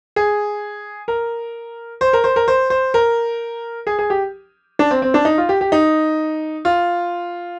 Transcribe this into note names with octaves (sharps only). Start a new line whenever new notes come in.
G#4
A#4
C5
A#4
C5
A#4
C5
C5
A#4
G#4
G#4
G4
D4
C4
C4
D4
D#4
F4
G4
G4
D#4
F4